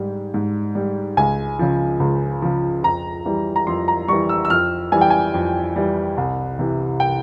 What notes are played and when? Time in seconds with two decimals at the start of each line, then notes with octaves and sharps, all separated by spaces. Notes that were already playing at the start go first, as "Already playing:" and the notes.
Already playing: G#2 G3
0.34 G#2
0.75 G3
1.17 C#2 G#5
1.59 C#3 F3
2.00 C#2
2.42 C#3 F3
2.83 F2 A#5
3.26 E3 G3
3.56 A#5
3.67 F2 C6
3.88 A#5
4.08 E3 G3 C#6
4.29 E6
4.45 E6
4.50 F2 F6
4.92 E3 G3 G#5
5.01 G5
5.10 G#5
5.34 F2
5.76 E3 G3
6.17 C2
6.59 C3 E3
7.00 G5